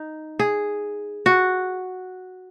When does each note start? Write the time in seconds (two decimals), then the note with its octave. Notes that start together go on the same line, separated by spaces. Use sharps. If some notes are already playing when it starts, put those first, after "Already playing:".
Already playing: D#4
0.39 G#4
1.26 F#4